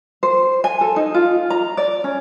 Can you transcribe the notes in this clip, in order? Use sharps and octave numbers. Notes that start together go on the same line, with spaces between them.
C5
G#5
A4
D#4
F4
A#5
D5
C#4